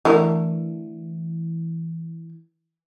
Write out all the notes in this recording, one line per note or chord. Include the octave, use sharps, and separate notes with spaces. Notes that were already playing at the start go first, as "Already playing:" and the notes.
D3 E3 A3 A#4